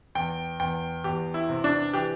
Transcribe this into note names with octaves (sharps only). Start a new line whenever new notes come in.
E2 G5
E2 G5
E2 G4
E4
C3
D4
E3 G4